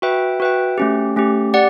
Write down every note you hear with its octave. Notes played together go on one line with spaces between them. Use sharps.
F#4 B4 E5 G5
F#4 B4 E5 G5
A3 C#4 G4
A3 C#4 G4
G4 D5 F#5